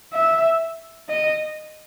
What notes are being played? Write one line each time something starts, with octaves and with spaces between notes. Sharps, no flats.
E5
D#5